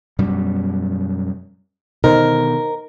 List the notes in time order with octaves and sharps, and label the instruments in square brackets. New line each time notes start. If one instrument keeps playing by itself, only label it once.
[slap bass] F#2 B2 G3
[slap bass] B2 D3 D#3 [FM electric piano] D#4 C5 [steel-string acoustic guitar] A#4